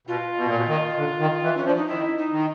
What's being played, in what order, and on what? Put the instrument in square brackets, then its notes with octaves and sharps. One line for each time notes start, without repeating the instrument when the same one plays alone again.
[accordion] B2 [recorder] F4
[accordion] B2
A#2
B2
D#3
D3
D#3
E3
[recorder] C#4
[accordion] F3
[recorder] D4
D#4
[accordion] D#3 [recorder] E4
[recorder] D#4
[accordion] D#3